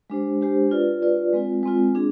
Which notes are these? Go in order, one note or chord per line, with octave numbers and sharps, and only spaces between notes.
G#3 D4 G4 C5
G#3 D4 G4 C5
F4 B4 D5
F4 B4 D5
G#3 C4 F4
G#3 C4 F4
D4 G#4